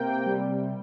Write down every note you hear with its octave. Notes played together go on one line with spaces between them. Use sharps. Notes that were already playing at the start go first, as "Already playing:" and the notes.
Already playing: C3 A#3 G5
G3